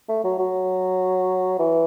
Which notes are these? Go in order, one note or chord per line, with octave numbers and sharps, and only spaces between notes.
A3
F#3
F#3
E3